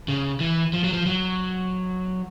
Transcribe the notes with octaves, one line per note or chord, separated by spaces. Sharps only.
C#3
E3
F3
F#3
F3
F#3